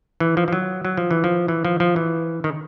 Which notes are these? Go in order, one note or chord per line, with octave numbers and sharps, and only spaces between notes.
E3
F3
F3
F#3
F#3
F3
E3
F3
E3
F3
F3
E3
D#3